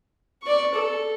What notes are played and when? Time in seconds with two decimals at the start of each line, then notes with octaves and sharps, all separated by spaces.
0.43 D5 C#6
0.74 A4